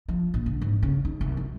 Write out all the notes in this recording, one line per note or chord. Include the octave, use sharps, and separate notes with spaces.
F3
A#1
D3
G#2
C#3
D#3
C2
F#3